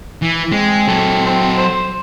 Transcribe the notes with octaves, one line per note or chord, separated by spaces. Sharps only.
E3
G#3 C4
F#3 A4
C4
C5